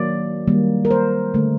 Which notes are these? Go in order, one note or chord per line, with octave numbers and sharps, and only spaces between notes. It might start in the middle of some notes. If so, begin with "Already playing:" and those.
Already playing: D#3 F#3 A#3 D5
D#3 G3 A#3
A#4
C5
D3 A3